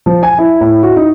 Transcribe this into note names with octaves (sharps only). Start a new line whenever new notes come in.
F3
G#5
E4
A2
F#4
D#4